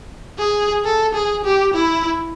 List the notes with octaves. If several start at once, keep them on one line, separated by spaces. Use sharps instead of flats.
G#4
A4
G#4
G4
E4